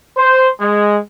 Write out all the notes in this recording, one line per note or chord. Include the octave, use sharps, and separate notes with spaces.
C5
G#3